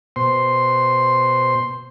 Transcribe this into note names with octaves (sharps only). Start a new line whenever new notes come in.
B2 C5 C6